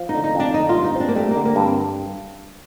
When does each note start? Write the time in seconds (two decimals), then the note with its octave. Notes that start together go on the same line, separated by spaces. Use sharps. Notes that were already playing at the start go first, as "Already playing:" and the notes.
Already playing: F3
0.09 D#4
0.14 D3
0.24 D#4
0.35 F2 D4
0.54 D3 D#4
0.69 F4
0.75 G2
0.84 D#4
0.95 C4 D4
1.08 A#3
1.15 G3 A3
1.31 D3 A#3
1.45 A#3
1.56 G2
1.62 C4